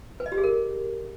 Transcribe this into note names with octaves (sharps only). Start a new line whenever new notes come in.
B4
D#5
G4
G#4
A#4